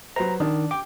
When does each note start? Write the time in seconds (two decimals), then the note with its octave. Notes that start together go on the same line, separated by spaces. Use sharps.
0.16 F#3 B4 C5 A#5
0.40 D#3 D4
0.71 G5 D6